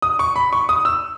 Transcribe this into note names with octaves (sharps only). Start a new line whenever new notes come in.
D#6
C#6
B5
C#6
D#6
E6